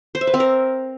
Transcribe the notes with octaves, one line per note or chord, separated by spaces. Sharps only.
C5
E5
B4
C4
A#4